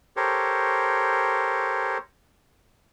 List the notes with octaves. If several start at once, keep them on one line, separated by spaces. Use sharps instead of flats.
G4 A4 A#4 C5 C#5